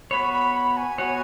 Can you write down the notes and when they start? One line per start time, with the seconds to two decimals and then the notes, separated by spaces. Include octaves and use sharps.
0.11 B3 F#4 C#5 B5
0.33 B5
0.55 B5
0.77 G#5
0.98 B3 F#4 C#5